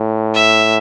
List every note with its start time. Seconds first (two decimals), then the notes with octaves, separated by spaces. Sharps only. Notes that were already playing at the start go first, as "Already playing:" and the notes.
Already playing: A2
0.34 E5